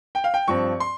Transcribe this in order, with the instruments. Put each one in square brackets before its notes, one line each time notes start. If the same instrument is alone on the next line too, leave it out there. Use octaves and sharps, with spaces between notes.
[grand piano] G5
F5
G5
G2 F3 C4 C#6
C6